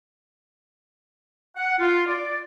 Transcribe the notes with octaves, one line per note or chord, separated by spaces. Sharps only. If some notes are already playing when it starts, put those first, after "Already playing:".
F#5
F4
D5